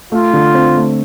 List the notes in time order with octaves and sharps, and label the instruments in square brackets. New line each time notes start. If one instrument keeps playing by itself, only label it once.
[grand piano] A3 [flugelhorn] F4
[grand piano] D3
C4
A3